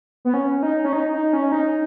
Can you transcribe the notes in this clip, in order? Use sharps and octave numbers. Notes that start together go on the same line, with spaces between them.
B3
C#4
D#4
C#4
D#4
D#4
C#4
D#4